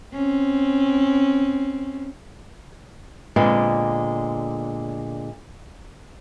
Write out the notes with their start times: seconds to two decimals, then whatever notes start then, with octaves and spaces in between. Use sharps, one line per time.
0.13 C4 C#4
3.36 A#2 D3 G#3 B3 C4